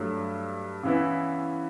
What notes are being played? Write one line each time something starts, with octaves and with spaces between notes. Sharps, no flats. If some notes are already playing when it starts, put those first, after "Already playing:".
Already playing: G2 F#3 A3 D4
C#3 E3 B3 E4